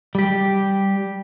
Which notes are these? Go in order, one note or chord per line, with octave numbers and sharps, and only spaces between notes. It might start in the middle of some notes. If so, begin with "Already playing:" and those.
G3 G4